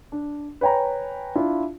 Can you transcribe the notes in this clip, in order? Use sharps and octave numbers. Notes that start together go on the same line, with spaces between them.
D4
B4 C#5 G5 G#5 A#5
D4 E4 F4